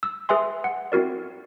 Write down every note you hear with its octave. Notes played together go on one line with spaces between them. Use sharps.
E6
G#4 B4 E5 G#5 C6
F#5
C4 E4 F#4 A#4 D5